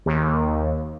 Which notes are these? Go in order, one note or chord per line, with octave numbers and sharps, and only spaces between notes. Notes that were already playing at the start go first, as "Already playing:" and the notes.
D#2